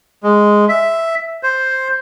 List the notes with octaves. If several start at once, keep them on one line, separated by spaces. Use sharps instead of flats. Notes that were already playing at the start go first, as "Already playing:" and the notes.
G#3
E5
C5